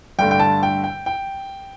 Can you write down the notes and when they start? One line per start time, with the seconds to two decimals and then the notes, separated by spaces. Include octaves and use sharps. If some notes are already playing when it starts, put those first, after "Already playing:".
0.19 G2 D3 A3 G5
0.31 G5
0.40 A5
0.63 G5
0.84 G5
1.06 G5